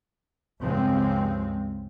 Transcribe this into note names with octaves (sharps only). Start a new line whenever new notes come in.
C#2 G2 F3 G#3 C4